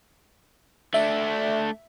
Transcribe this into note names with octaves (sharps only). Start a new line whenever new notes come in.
A3 D4 E5